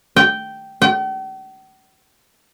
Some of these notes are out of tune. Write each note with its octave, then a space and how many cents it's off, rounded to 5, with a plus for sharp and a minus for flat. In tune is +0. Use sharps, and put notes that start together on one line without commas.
G5 -10
G5 -45